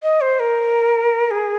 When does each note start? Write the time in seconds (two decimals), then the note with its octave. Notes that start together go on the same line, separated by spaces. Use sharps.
0.03 D#5
0.21 C5
0.40 A#4
1.31 G#4